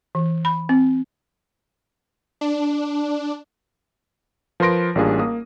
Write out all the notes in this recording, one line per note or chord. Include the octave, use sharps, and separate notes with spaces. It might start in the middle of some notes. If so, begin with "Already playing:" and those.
E3
B5
C4
D4
F3 A#4 B4 C6 A#6 D7
A1 G3 A#3 D4 F4 G#4
A#3 D#6